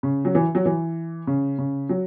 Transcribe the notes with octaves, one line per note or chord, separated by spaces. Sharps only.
C#3
F#3
E3
F#3
E3
C#3
C#3
F#3